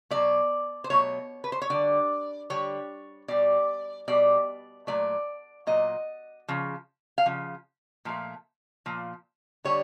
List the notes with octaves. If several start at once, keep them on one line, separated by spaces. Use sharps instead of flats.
B2 F#3 A3 D5
C5
B2 F#3 A3 C#5
B4
C5
C#5
D3 G3 D5
D3 G3 C#5
B2 G3 D5
B2 G3 D5
A#2 F#3 A3 D5
A#2 F#3 D#5
C#3 F3
F5
C#3 F3
A#2 F3 A3
A#2 F3
D3 G3 C#5